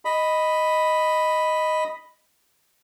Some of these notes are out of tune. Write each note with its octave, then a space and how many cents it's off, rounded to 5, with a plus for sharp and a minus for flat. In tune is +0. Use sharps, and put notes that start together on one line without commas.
D#5 +0 B5 +0